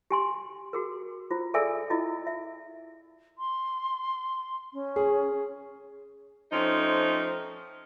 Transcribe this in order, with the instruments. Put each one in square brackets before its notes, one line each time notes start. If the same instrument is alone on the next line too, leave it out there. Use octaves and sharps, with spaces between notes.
[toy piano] G4 G#5 C6
F#4 G#4 A#4
F4 C5 A#5
G#4 A4 D5 E5 G#5 E6
E4 F4 D#5
E5
[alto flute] C6
C#4
[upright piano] G#4
[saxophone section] F3 A3 C4 C#4 D#4